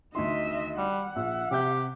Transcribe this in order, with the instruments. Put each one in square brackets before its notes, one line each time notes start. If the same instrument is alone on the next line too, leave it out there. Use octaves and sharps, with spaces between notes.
[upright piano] D2 D#4 C6 [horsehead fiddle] D#5 E5
[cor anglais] G3 [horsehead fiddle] F#5
[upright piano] A#1 [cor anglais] E5
[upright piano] C3 E5 G6 [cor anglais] G4